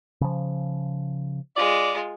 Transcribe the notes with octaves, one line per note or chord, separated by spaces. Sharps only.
C#3 F3
G#3 F4 D5